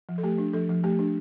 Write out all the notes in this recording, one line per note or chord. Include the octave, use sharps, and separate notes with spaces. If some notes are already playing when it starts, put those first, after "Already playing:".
F3
A4
A3 G4
D4
F3 A4
F3
A3 G4
D4